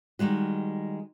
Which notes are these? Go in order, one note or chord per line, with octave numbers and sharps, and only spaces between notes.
D#3 G3 G#3 F#4